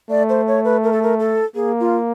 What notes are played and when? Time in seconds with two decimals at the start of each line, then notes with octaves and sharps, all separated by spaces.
0.10 A3 D5
0.29 C5
0.47 C#5
0.64 B4
0.83 A#4
0.92 A4
1.02 A#4
1.19 A4
1.55 A#3 G#4
1.80 F4